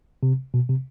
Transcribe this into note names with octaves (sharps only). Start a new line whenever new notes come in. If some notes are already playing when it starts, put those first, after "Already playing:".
C3
B2
C3